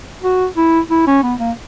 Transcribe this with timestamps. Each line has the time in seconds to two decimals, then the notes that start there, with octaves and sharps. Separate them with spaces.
0.23 F#4
0.57 E4
0.91 E4
1.07 C#4
1.23 B3
1.40 A#3